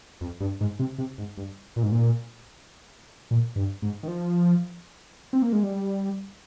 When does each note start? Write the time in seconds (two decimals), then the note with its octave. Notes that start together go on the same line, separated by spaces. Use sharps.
0.21 F2
0.40 G2
0.61 G#2
0.79 C3
0.98 C3
1.18 G#2
1.37 G2
1.76 A#2
1.83 G#2
1.92 A#2
3.31 A#2
3.56 G2
3.82 G#2
4.03 D#3
4.08 F3
5.33 C4
5.42 A#3
5.53 G#3
5.63 G3